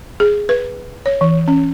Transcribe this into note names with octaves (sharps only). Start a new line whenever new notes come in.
G#4
B4
C#5
E3
C#4